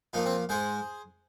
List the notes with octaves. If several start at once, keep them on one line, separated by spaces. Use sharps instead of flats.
A#2 F3 A#3 D#4
C4
G#2 G#3 G#4 C5